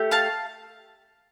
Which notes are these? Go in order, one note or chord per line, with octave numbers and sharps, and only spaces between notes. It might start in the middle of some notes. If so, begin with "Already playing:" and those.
Already playing: A3 G4
F5 A5